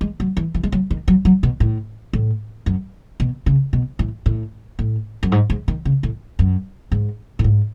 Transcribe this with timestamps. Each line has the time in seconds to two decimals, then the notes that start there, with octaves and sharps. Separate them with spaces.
0.01 G#3
0.20 F#3
0.37 E3
0.54 E3
0.63 G#3
0.72 F#3
0.91 D#3
1.08 F#3
1.25 F#3
1.43 B2
1.60 A2
2.13 A2
2.66 F#2
3.20 B2
3.46 C#3
3.73 B2
3.99 A2
4.26 A2
4.79 A2
5.23 F#2
5.32 G#2
5.50 G#2
5.68 D#3
5.85 C#3
6.03 A2
6.39 F#2
6.92 G#2
7.39 A2
7.44 G#2